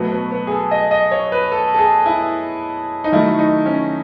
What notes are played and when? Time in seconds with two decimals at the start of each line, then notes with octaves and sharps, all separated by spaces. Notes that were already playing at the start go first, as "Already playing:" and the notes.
Already playing: B2 F#3 A3 B3
0.12 B3
0.31 B3
0.47 G#4
0.51 A4
0.71 D#5
0.91 D#5
1.12 C#5
1.32 B4
1.52 A4
1.74 A4
1.79 G#4
2.06 E4
3.04 D#4
3.12 D#3 F#3 A3 E4
3.39 D#4
3.66 C#4